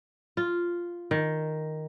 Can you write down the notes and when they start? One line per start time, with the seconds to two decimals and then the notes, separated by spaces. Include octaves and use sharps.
0.37 F4
1.11 D#3